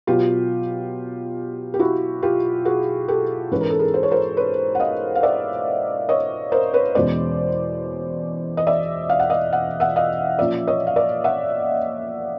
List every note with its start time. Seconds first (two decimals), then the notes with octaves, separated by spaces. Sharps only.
0.07 B2 F#3 B3 F4 G4
1.74 G4
1.79 E4 F#4
2.23 F4 G4
2.65 F#4 G#4
3.08 G4 A4
3.51 G#2 E3 G#3 C#4 B4
3.61 A#4
3.70 A4
3.79 G#4 A#4
3.94 C5
4.03 C#5
4.11 A#4 C5
4.37 B4 C#5
4.75 F#5
4.80 D#5 F5
5.15 F5
5.23 D5 E5
6.09 C#5 D#5
6.52 A#4 C5
6.74 B4 C#5
6.95 E2 B2 G#3 C#4 C5 D5
8.57 D#5
8.67 D5 E5
9.09 F5
9.20 F#5
9.30 D#5 F5
9.53 F#5
9.80 E5 F#5
9.96 D#5 F5
10.39 A#2 F3 A#3 C#4 D5 E5
10.67 C#5 D#5
10.87 F5
10.96 D5 E5
11.24 E5 F#5